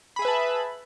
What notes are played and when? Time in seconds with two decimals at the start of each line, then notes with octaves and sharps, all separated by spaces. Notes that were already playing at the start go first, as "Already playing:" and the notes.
0.16 B5
0.19 G#4
0.22 E5
0.25 B4
0.28 A5